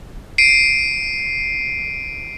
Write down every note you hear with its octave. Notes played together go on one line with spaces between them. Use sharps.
C7 D7 D#7